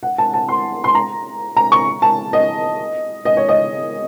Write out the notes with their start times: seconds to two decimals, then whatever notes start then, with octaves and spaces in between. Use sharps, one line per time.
0.03 F#5
0.18 A5
0.34 A5
0.49 C6
0.84 C6
0.95 A#5
1.57 A#5
1.72 C#6
2.02 A5
2.33 D#5
3.25 D#5
3.37 C#5
3.49 D#5